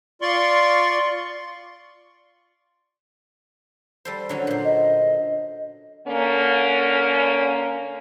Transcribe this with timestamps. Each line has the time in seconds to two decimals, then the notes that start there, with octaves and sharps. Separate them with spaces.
0.22 F4 D5 C6 C#6
4.05 G3 A4 C5
4.29 D3 F#3 C#4
4.47 A#2 C5
4.64 D#5
6.08 D3 A#3 C#4